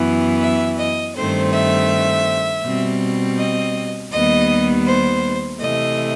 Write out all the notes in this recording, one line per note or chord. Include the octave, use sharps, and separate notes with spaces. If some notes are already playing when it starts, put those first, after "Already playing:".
Already playing: F#2 E3 B3
E5
D#5
G2 D#3 A3 C4 C5
E5
B2 G3 C4
D#5
D#2 D#3 G3 B3 D#5
C5
C3 E3 A3 D#5